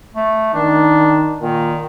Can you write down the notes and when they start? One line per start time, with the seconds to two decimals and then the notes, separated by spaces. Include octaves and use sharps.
0.15 A3
0.54 D#3 D4
1.41 A#2 D#3